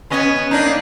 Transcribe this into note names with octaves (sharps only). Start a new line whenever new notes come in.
B3 C#4 D#5
A#3 D4 D#4